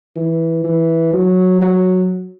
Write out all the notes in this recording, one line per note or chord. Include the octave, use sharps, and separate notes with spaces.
E3
E3
F#3
F#3